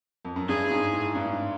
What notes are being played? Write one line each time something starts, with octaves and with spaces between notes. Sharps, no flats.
F2
F#2
G2 G#4
G#2
A2
G2
G#2